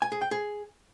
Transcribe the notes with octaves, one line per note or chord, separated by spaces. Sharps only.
G#5
G#4
G5
G#4